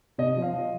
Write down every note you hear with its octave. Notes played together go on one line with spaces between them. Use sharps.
C3 D#5
F3
F5
F3